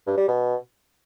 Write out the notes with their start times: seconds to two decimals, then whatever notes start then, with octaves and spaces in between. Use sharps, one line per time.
0.06 G2
0.17 G3
0.28 B2